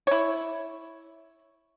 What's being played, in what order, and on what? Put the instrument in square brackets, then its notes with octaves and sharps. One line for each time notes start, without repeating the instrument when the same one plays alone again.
[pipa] E4 C#5